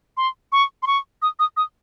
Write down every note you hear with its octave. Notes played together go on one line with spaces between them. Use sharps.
C6
C#6
C6
C#6
D#6
D#6
D#6